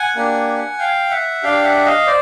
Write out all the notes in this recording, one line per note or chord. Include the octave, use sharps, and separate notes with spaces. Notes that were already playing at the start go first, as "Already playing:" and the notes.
Already playing: F#5 G#5
A#3 D4 G4
F5 G5
E5 F#5
D4 G4 F5 G5
E5 F#5
D#5 F5
C5 D5